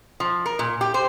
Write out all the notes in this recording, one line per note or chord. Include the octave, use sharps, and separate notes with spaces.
F3
A#4
A#2
G4
C5